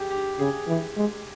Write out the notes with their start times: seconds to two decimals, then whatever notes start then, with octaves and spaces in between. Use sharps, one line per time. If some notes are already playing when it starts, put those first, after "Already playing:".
Already playing: G4 G#4
0.10 G4
0.39 C#3 G#4
0.68 E3
0.96 G#3